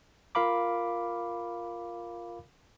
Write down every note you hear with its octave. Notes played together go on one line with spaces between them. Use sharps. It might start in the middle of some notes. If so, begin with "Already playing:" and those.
F4 A#4 F5 B5 D6